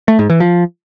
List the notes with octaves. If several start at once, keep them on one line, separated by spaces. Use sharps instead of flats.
A3
G#2
E3
F3